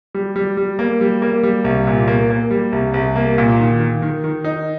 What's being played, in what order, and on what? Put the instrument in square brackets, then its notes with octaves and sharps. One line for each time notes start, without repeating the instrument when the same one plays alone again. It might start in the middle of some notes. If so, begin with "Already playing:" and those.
[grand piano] G3
G3
G3
A#3
G3
A#3
G3
C2
A#2
A#3
A#3
G3
C2
C2
A#3
A#2
D#3
D#3
D#3
D#3
D#4